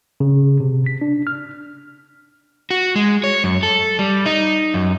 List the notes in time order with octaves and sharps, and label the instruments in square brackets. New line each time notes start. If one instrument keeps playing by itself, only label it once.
[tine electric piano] C#3
C3
B6
D4
F6
[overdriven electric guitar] F#4
G#3
C#5
F#2
A4
G3
D#4
F#2